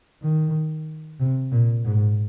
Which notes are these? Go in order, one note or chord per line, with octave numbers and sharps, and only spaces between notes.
D#3
C3
A#2
G#2